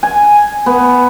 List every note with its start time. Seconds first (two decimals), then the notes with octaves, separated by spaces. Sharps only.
0.03 G#5
0.66 B3